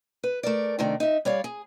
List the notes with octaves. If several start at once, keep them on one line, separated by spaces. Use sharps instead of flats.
B4
A3 A#4 D5
C3 D#3 A3 D4
D#4 E5
G3 C#5 D5 F5
G#4